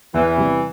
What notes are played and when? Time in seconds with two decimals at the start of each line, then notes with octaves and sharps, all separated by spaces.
0.14 E2 E3
0.37 C3 G3